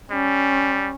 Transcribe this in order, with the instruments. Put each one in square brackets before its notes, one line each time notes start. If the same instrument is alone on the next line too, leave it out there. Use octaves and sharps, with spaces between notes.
[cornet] G3 [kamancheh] C#4